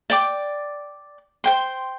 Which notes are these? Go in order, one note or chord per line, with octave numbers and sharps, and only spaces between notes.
D5 G5 D6
C5 G5 C6